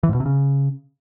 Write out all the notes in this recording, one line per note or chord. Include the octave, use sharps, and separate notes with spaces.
E3
G#2
B2
C3
C#3